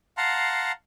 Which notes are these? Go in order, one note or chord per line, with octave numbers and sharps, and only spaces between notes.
F5 F#5 A5 A#5 C6